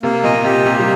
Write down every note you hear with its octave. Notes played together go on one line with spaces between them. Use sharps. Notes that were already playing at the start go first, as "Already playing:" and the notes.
C3 A#3
A#2 D#5
C3 G4
C3 A#3
G3